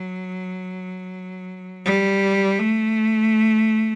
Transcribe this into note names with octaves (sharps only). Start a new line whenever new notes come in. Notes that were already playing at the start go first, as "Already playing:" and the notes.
Already playing: F#3
G3
A3